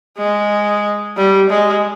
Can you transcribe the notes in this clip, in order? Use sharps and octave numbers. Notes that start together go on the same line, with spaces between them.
G#3
G3
G#3